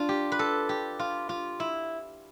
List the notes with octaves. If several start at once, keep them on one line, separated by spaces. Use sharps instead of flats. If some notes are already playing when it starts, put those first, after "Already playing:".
Already playing: D4 F4
G4
B4
A4
G4
F4
F4
E4